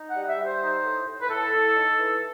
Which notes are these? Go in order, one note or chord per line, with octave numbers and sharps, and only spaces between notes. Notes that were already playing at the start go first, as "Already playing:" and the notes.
Already playing: D#4
F#5
G3
E5
G3
C5
D#4
A2
A2
B4
A2 A4
A2
D#4
E3